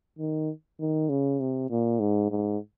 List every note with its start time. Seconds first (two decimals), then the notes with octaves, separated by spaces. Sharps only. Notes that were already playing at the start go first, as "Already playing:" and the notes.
0.19 D#3
0.80 D#3
1.09 C#3
1.40 C3
1.70 A#2
2.00 G#2
2.31 G#2